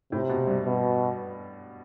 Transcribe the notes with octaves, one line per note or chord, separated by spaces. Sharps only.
A2 C3
B2
G2
B2